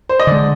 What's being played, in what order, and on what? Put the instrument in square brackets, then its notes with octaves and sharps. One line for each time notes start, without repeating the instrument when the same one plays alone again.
[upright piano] C5
D#5
[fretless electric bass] D3 G#3 [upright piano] D5